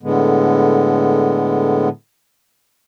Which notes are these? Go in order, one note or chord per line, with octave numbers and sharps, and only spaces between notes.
A2 D3 G#3 B3